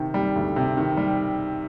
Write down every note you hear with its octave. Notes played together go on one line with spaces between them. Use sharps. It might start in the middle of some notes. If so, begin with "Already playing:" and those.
Already playing: C3 D#3
G3
D2
C3
D#3
G3